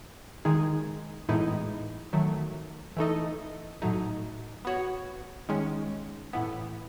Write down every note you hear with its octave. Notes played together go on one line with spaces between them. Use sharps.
D#3 G#3 D#4 G#4
A2 E3 G#3 B3 D#4
D#3 F#3 A3
E3 A3 D#4 A4 D#5
A2 F#3 A3 D#4
B3 F#4 C#5
D#3 G#3 C#4
A2 E3 B3